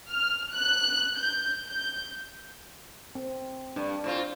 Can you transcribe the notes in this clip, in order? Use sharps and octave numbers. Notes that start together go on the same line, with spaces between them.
F6
F#6
G6
G6
C4
G2 D4
A2 C4 F4